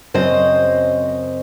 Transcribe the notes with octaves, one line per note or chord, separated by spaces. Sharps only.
F#2 C#3 F#3 C4 C5 D#5